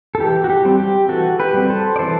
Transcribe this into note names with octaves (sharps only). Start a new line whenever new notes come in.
A4
E3 G4
F#4
G4
G3 C4
G4
E3 F#4 A4
G4 B4
G3 C4
A4 C5
D5
E3 A4 C5